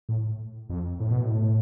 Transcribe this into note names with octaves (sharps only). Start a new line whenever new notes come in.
A2
F2
A2
B2
A2